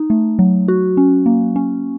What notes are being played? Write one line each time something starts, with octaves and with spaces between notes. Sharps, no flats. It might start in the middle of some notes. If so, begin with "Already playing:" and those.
Already playing: D#4
A3
F#3
F#4
C#4
A#3
C#4